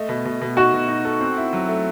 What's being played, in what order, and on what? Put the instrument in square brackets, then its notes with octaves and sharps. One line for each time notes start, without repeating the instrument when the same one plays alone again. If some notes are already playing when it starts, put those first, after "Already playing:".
Already playing: [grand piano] A3 D#5
B2
B2
B2
[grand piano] D#4 [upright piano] F#4
[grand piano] B2
D#4
A4
C4
E4
F#3
A3